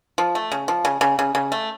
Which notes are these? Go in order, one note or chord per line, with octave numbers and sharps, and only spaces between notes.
F3
A3
C#3
F3
C#3
C#3
C#3
C#3
A3